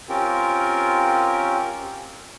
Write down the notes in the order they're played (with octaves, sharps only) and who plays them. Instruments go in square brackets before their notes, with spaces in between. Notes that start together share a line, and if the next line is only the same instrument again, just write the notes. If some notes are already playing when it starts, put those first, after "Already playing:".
[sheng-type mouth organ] C4 C#4 F4 G4 A#4